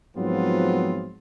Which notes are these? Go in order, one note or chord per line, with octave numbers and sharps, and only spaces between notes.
G#2 F3 F#3 B3 C4 F4